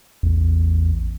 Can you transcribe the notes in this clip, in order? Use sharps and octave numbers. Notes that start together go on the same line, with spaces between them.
A1 E2